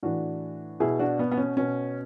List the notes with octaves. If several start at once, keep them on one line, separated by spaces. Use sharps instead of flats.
A2 E3 D4 F#4
B2 E4 G#4
D4 F#4
B3
B3
C#4
B2 C#4